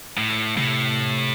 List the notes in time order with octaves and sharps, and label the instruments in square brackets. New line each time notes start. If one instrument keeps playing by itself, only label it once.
[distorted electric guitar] A2
[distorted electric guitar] A2 [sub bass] C3